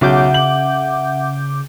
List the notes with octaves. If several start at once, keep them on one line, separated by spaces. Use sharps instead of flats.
B1 C#3 E5 F#5 D6 G6
F#7